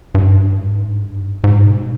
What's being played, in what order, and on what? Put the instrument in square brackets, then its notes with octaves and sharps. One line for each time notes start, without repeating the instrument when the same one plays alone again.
[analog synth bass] G2
G#2
G2
G#2
B2